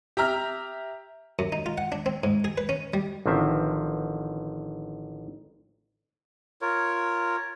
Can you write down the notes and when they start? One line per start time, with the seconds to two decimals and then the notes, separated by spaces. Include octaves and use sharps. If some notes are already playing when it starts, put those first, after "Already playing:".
0.17 G4 E5 A#5 F6
1.39 F#2
1.52 D#4
1.66 F4
1.78 F#5
1.92 D4
2.06 C4
2.24 G#2
2.44 G#4
2.58 B4
2.69 C#4
2.94 G3
3.26 A1 D3 D#3 F3 C4 E5
6.62 F4 A#4 C#5